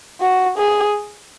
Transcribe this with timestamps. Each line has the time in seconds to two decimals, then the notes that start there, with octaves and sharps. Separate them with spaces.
0.21 F#4
0.58 G#4